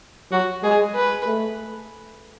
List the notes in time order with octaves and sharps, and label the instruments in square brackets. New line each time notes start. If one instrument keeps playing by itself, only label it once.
[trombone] F#3 [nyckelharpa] F#4
[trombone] G#3 [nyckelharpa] G#4
[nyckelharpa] B4
[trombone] A3